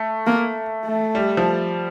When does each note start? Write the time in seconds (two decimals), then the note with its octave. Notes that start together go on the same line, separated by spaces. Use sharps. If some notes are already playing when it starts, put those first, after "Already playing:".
Already playing: A3
0.27 A#3
0.86 A3
1.15 G3
1.37 F3